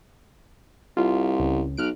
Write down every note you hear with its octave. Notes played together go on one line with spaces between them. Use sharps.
C2 F4
C#2
B1 F6 F#6 D7